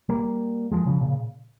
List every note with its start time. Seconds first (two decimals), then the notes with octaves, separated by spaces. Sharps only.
0.09 G3 A#3
0.72 F3 G#3
0.86 C#3 F3
1.01 A#2 C#3